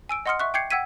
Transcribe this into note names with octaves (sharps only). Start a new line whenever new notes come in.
G#5 E6 D7
D#5 F#5 C6 D#6 F6 C#7
E5 C#6 F#6
G5 D6 G6 G#6 C7 C#7
F#5 G5 E6 G#6 B6 D#7